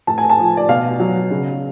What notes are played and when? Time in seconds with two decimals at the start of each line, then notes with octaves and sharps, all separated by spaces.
0.07 A2 A5
0.18 G#5
0.30 A5
0.39 F3
0.57 D5
0.69 B2 F5
1.00 F#3
1.31 C#3